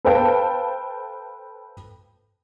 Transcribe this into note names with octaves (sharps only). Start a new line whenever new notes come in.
A4 B4 C5 F5 G5 A5